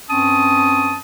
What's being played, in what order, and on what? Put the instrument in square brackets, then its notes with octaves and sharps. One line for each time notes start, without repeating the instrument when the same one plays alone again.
[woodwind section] G2 C4 C#4 A5 D#6